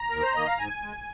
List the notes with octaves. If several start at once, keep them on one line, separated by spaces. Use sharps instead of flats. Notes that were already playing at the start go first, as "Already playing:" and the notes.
Already playing: A#5
D#2 A#4
C5
D#3 A#3 D#5
F5
G#2 G#5
G#3